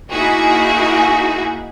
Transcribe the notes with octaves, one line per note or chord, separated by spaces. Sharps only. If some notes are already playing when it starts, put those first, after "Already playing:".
A#3 D#4 E4 F#4 G#4